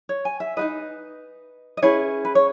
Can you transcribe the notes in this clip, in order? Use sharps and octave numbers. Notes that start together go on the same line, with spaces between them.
C#5
G#5
E5
D#4 F#4 B4 D#5
D#5
C#4 E4 G#4 B4 C#5
B4
C#5